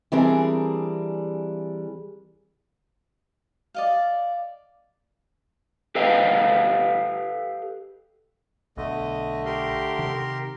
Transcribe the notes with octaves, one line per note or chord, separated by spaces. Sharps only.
E3 G3 C4 D4 G#4 A#4
D5 D#5 F5
G4 A4 B4 D#5 F5 G5
B1 D3 A3 D#5
G4 A#4 C6
C3 D#3